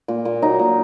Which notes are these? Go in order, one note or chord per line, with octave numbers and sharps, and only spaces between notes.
A#2
A#2
F#3 D#4
A#2